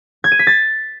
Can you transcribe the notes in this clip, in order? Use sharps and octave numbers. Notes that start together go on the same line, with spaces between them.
G#6
D#7
B6
A6